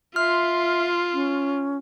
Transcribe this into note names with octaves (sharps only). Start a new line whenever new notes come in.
F4 E5 C6 F6
C#4